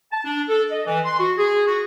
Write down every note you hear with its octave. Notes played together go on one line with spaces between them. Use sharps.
A5
D4
A4
D#5
E3
C6
F#4
G#4
F#4